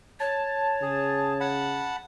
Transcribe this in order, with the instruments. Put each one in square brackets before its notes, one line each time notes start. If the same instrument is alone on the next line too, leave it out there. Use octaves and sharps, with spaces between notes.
[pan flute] C#5 [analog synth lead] A5
[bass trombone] C#3 [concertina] G#4
[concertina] F#5 A5 B5